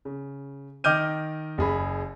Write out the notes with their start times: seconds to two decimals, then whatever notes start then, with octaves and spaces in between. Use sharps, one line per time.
0.05 C#3
0.84 D#3 D#5 D6 F6 G6 D#7
1.58 F#1 G#4 B5